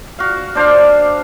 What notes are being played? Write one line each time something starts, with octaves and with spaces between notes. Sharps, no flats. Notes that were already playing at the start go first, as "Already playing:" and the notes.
F#4 F5
D4 C5 D5 F5